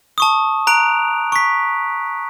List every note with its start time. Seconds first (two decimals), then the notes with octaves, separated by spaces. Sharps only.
0.18 A5 C#6 D#6
0.67 A#5 F#6 D7 F7
1.32 C#6 B6